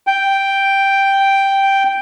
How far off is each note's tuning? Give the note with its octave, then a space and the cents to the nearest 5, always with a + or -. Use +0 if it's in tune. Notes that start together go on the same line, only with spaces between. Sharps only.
G5 +0